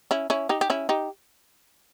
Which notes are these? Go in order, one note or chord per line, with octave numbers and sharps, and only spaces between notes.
C#4 E4
C#4 E4
D#4 G4
G4
C#4 E4
D#4 G4